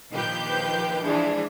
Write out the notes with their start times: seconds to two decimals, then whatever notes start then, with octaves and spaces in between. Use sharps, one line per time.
0.11 A#1 D#3 F3 G4 B4 G6
1.04 E3 F3 G#3 D4